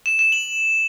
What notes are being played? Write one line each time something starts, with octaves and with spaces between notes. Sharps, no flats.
E7
E7
F#7